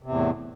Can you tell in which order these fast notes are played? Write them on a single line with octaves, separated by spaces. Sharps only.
C3 E2 A2